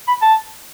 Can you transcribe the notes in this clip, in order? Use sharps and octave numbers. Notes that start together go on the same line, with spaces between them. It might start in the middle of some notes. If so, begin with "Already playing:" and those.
B5
A5